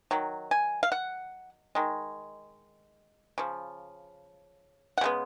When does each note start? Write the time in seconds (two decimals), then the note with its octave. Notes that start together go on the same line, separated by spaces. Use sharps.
0.11 D#3 F#3
0.51 G#5
0.83 F5
0.92 F#5
1.75 D#3 G#3
3.38 C#3 F3
4.98 F#5
5.01 C#3 G#3 B3